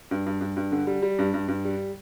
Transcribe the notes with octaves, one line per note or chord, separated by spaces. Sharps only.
G2
G2
G2
G2
D3
G3
G3
G2
G2
G2
G3